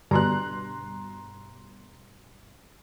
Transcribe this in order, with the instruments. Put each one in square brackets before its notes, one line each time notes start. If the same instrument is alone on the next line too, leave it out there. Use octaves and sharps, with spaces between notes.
[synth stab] G2 B2 [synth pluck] D3 [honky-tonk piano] A#5 C6 F#6